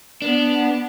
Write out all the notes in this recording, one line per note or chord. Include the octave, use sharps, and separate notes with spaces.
B3 D4